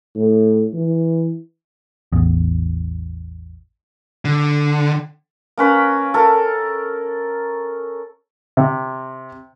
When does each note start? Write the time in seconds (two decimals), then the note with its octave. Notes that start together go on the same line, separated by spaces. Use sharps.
0.16 A2
0.73 E3
2.12 A1 E2
4.25 D3
5.57 A#3 C#4 B4 A#5
6.14 A4 A#4
8.57 C3